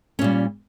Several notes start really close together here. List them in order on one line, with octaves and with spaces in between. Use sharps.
C#4 A#2 G3